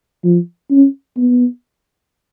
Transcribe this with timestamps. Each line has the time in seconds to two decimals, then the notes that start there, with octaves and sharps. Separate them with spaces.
0.24 F3
0.71 C#4
1.17 B3